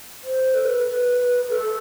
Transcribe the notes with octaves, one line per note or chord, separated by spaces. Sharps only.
C5
A4
B4
A4